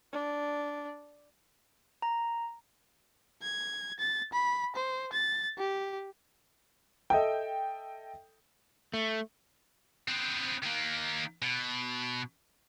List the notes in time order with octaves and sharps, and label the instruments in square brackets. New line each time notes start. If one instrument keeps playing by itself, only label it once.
[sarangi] D4
[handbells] A#5
[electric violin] G#6
A6
B5
C5
A6
G4
[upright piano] A4 D#5 E5 G5
[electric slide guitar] A3
[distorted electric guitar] B3 C4
D#3 A#3
B2